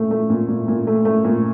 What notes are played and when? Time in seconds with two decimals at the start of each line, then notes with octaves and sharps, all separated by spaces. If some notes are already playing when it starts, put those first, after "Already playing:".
Already playing: A#2 A3
0.11 A3
0.30 A#2
0.49 A#2
0.68 A#2
0.87 A3
1.05 A3
1.25 A#2